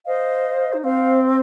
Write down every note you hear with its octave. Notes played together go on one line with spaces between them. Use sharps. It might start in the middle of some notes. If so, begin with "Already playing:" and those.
C5 D#5 F5
D#4
C4 C5 F5
C5